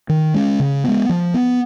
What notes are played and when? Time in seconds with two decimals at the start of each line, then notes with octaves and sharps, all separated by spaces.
0.09 D#3
0.34 G#3 C#4
0.60 C#3
0.84 G#3 B3
1.09 F3
1.34 B3